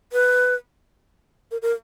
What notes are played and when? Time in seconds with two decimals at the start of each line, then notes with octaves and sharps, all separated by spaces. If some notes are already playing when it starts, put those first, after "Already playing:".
0.12 B4
1.51 A#4
1.62 A#4